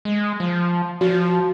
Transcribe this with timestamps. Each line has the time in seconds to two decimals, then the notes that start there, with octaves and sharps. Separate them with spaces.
0.05 G#3
0.40 F3
1.01 F3 F#4